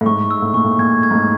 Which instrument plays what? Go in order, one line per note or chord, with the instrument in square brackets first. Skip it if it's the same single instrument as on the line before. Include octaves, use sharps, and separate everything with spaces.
[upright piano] A2
[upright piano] G#2 [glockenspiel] C#6
[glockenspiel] E6
[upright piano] A2
[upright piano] A#2 [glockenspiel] C#6
[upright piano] A2
[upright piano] A#2 [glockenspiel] G#6
[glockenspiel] G#6
[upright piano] G#2
A2